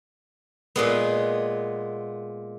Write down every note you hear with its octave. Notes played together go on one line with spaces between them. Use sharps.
A#2 G#3 B3